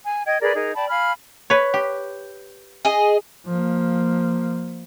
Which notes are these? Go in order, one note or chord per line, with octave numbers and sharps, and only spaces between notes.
G#5
D#5 G5 G#6
G#4 A#4 B4 D5
D#4 G#4 A#4
D5 G5 A5 B5
F5 G#5 B5 F6
B4 C#5
G4
G#4 D#5
F3 A#3